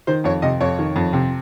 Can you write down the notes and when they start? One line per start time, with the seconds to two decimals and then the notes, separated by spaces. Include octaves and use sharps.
0.07 D#3 C5
0.24 F2 C#5
0.42 C3 D#5
0.61 F2 C#5
0.79 D#3
0.96 F2
1.13 C3